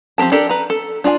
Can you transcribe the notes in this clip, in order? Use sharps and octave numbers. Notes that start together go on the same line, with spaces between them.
F3 C4 G4 A#4 A5
D4 G4 A4 A#4 D5
B4 A#5
A4
D4 F4 D5 G#5